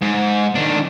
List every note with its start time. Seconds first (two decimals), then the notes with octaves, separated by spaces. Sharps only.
0.02 G#2
0.55 D#3 D4